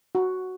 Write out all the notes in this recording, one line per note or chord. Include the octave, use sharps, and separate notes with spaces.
F#4